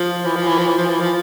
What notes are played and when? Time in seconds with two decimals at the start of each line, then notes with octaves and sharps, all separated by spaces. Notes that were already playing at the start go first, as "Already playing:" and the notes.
Already playing: F3
0.25 E3
0.36 F3
0.47 E3
0.58 F3
0.68 E3
0.78 F3
0.89 E3
1.00 F3